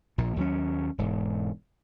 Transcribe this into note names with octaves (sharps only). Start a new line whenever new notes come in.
A#1 A#2
D#2 F#3 A3 C#4
E1 G#2